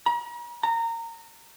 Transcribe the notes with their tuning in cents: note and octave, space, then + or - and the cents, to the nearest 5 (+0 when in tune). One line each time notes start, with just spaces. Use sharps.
A#5 +40
A#5 -25